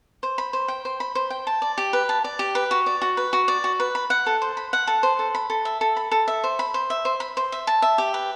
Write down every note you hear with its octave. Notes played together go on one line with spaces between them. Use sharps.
C5
B5
C5
G5
C5
B5
C5
G5
A5
D5
G4
B4
A5
D5
G4
B4
F#4
D5
F#4
B4
F#4
D5
F#4
B4
B5
F#5
A4
C5
B5
F#5
A4
C5
A4
B5
A4
E5
A4
B5
A4
E5
C5
B5
C5
E5
C5
B5
C5
E5
A5
E5
G4
B4